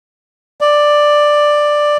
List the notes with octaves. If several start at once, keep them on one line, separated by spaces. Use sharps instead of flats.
D5